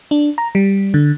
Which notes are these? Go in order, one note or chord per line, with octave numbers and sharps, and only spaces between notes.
D4
A#5
G3
D3